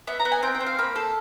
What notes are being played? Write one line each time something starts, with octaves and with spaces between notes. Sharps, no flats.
B3 E5
A#5
B3
G#5
C4 G5
G5
C4
F5
A#3 B5
A4